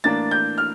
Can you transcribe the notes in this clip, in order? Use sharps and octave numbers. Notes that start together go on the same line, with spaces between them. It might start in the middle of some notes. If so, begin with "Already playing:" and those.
A2 E3 A#3 D4 A6
G6
F6